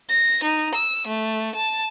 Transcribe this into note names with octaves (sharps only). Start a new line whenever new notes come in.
A#6
D#4
E6
A3
A5